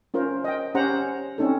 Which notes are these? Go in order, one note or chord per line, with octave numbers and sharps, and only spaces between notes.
C#4 F4 A#4 C5
D#5 G5
C#4 G4 C5 F#5 A#5
C4 C#4 D#4 A4